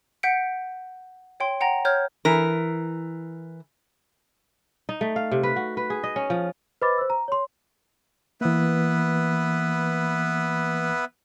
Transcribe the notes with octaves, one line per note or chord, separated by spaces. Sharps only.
F#5 G6 B6 C#7 D7
C#5 G5 C6
F#5 G5 A#5 A#6
C#5 F6 G6 G#6
E3 A#4
D#4
A3
F5
C3
B4
F#4
B4
G#4
D#5
C#4
F3
B4 C5 D#5 B5 D6 A6
C5 E6
A#5
C#5 C6
E3 A#3 B3 B4 E5